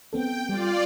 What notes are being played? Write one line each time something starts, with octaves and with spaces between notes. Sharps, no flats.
B3 C4 A4 G5
G3 F4 D5